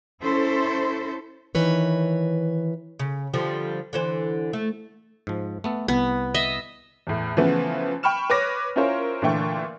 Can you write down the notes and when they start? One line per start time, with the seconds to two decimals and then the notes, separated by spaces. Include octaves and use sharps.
0.22 C#4 E4 A4 C5
1.55 D#3 E3 B4 C#5
3.00 C#3
3.34 D3 F3 G3
3.93 D3 E3 C5
4.53 A3
5.27 G#2 F3
5.64 A3 B3 A4
5.88 C2 B3
6.34 D#5 E5
7.07 E2 A2
7.37 C#3 E3 F3 A3 B3
8.03 G5 B5 C#6 F6 E7
8.30 B4 C#5 D6 A#6
8.76 C#4 E4 F4 A#4 C5 C#5
9.22 A#2 D3 E3 A3 G5 C#6